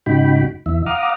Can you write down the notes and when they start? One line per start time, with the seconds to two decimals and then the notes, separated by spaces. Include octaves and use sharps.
0.06 G#2 C#3 D#4 F#4 G5 B5
0.66 E2 E3 E5
0.86 F5 F#5 A#5 D6 D#6 F6